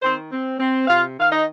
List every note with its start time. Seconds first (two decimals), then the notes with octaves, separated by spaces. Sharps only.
0.02 D#3 C4 C5
0.31 C4
0.59 C4
0.88 C3 F4 F5
1.17 D#3 F5
1.31 D#4 D#5